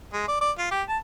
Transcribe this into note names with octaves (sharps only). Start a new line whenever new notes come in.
G#3
D5
D5
F4
G4
A5